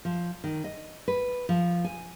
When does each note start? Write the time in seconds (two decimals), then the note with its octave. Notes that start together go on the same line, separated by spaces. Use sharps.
0.05 F3
0.44 D#3
0.64 D#5
1.08 B4
1.49 F3
1.85 G#5